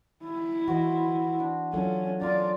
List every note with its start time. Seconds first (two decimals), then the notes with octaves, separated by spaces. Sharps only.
0.25 E4
0.67 E3 F#4 C5 D#5
1.40 D4
1.73 F#3 C#4 F4 A4
2.21 C#4 F4 A#4 D5